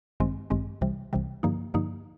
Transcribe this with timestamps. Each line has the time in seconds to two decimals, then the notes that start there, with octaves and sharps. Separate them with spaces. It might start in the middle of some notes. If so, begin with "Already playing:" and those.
0.20 A1 G2 D#3 G#3 C4
0.50 A1 G2 D#3 G#3 C4
0.81 C2 C3 E3 G3
1.13 C2 C3 E3 G3
1.43 G2 D3 F3 A#3 D#4
1.74 G2 D3 F3 A#3 D#4